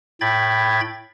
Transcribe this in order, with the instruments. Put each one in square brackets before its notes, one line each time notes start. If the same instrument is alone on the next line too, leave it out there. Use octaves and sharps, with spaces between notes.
[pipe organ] A2 G5 B5 G#6 A6